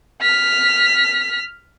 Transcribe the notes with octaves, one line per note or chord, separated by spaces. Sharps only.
F6 B6